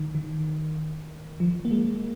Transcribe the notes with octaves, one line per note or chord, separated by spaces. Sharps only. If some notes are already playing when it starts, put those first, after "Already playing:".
Already playing: D#3
D#3
F3
A#3
G#3